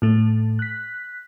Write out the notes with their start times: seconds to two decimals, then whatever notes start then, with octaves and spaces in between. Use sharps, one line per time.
0.02 A2 A3
0.59 F#6 B6